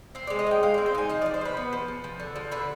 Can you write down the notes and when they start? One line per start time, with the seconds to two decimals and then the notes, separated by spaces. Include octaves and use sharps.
0.15 C4 C5
0.27 G#3 D5
0.39 D#5
0.47 D#4 G5
0.63 G#3 F5
0.74 C4 D5
0.86 C5
0.94 D#4 G#5
1.09 F3 D#5
1.22 F3 D5
1.34 C5
1.41 F3 B4
1.57 B3
1.73 F3
1.88 F3
2.04 F3
2.20 D3
2.36 F3
2.51 D3 B4